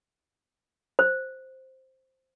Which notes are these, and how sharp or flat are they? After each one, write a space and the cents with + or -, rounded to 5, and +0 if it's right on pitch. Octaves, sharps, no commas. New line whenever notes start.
C5 +5